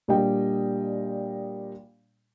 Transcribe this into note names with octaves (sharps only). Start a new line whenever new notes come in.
A#2 G3 D4 D#5 G5